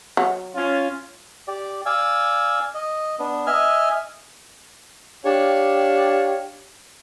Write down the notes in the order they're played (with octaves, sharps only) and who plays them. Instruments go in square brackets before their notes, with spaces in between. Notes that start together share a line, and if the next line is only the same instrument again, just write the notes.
[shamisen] F#3
[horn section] C#4 F4
[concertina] G4 D5
D5 F5 G#5 E6
D#5
B3 D4
D#5 E5 G#5 F6
[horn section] D4 G4 C#5 F5